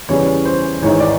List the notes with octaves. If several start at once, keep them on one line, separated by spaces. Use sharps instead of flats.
E2 C#3 E3 G3 C#5
C5
G#1 G#2 E3 C#5
D5